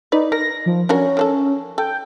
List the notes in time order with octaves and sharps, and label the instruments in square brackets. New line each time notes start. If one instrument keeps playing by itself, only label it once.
[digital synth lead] D#4 [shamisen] B4 D5
[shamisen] A#4 [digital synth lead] A#6
[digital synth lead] F3
[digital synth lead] C#4 [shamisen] D4 F#4 A#4
[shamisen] D#3 D4 A4
[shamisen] A4 [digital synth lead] G5